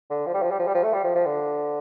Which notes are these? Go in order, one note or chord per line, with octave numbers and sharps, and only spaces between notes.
D3
F3
G3
F3
G3
F3
G3
F3
A3
G3
F3
F3
D3